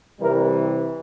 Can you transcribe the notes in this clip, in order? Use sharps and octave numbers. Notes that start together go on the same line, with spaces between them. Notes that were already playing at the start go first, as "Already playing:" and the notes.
C3 E3 G3 A#4